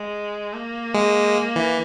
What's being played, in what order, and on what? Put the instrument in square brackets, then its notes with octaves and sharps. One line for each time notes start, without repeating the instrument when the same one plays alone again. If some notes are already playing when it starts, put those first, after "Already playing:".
Already playing: [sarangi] G#3
A#3
[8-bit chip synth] G#3
E3